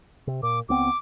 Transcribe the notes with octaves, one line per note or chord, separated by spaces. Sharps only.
C3
A#2 D6
C#2 B3 C4 D6